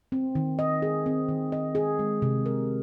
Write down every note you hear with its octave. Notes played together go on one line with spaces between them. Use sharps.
C4
D#3
D#5
G#4
C4
D#3
D#5
G#4
G#3
C3
A#4